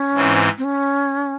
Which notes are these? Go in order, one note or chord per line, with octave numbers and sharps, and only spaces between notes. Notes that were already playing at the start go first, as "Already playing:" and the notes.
Already playing: C#4
G#2 E3 C4
C4
C#4